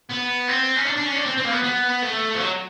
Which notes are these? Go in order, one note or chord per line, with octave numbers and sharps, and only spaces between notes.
B3
C4
C#4
D4
D4
C#4
D4
C4
C4
A#3
B3
B3
A3
F3
F#3